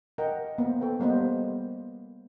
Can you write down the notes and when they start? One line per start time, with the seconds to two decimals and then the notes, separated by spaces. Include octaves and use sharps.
0.18 A#4 D#5 F#5 G5 A#5
0.58 A#3 B3 C5
0.81 A4 B4 G5
1.00 G3 A#3 B3 C5 D#5